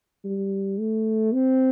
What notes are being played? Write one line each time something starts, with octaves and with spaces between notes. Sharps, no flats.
G3
A3
C4